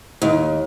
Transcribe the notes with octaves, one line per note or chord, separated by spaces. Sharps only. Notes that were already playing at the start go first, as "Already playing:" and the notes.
D#2